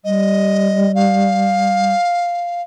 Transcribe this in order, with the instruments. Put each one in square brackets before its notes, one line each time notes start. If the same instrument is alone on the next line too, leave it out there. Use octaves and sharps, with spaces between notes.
[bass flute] G3 [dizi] D#5
[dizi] F5